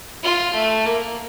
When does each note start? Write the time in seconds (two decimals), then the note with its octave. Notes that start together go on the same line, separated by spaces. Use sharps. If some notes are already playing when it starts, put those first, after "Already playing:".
0.23 F4
0.54 A3
0.86 A#3